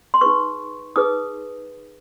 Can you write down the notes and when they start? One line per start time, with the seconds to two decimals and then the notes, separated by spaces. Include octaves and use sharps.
0.14 C6
0.21 D#4 G#4 B4 C#6
0.96 D#4 G#4 B4 D#6